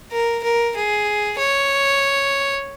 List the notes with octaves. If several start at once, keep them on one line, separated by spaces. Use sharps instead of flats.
A#4
A#4
G#4
C#5